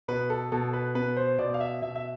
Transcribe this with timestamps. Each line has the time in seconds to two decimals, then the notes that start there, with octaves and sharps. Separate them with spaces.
0.08 B2 B4
0.30 A4
0.52 B2 A4
0.73 B4
0.95 B3 B4
1.17 C5
1.39 B2 D5
1.54 F5
1.61 E5
1.82 B2 E5
1.96 E5